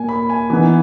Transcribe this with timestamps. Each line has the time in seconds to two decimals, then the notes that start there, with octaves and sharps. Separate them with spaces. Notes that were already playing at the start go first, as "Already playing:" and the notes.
Already playing: A#2 A#3 G#5
0.09 B5
0.30 G#5
0.50 E3 B3 D#4 G#5